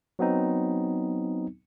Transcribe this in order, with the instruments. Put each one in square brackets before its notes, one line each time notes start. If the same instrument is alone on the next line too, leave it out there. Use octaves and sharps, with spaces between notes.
[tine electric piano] F#3 B3 C4 D#4